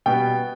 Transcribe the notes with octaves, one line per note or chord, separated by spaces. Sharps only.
B2 G3 B3 G5